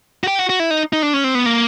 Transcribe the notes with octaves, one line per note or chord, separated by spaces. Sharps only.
F#4
G4
F#4
F#4
E4
D#4
D#4
D4
C#4
C4
B3
A#3